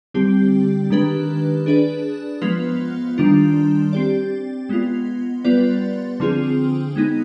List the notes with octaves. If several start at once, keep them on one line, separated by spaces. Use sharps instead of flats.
D3 G3 C4 G4
D#3 G#3 D4 G4 B4
D4 G#4 B4 D5
F3 G#3 B3 F4 B4
D#3 G3 D4 F4
C4 G4 D5
G#3 B3 F4
G3 B3 F4 B4 D5
D3 F3 C4 F4 G#4
G#3 B3 D#4